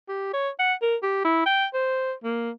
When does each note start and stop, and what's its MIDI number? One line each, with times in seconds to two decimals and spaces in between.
0.09 0.33 67
0.33 0.49 73
0.59 0.73 78
0.82 0.96 70
1.03 1.24 67
1.25 1.42 64
1.46 1.65 79
1.74 2.13 72
2.24 2.50 58